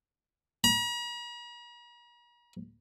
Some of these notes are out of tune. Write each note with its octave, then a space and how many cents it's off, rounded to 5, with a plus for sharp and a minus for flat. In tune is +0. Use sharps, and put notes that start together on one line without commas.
A#5 +45